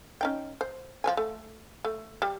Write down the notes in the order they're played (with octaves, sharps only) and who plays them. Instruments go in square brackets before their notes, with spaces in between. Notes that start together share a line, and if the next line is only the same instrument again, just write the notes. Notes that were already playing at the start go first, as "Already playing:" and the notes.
[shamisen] C#4 D#4 G5
C5
F3 C#5 G#5
A3
A3
G3